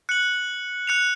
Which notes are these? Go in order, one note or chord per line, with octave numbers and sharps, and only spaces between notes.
F#6 C#7 F#7
F#6 C#7 F7